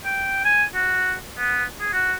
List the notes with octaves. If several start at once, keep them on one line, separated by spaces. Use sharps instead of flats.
G5
G#5
F#4
B3
G#4
F#4